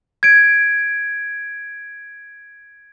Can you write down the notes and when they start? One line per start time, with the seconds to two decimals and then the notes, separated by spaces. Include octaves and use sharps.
0.23 G#6 D7